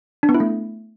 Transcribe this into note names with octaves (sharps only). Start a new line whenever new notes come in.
D4
B3
E4
A3